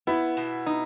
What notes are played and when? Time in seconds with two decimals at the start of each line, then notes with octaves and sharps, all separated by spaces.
0.07 B3 E4
0.37 B2
0.66 D#4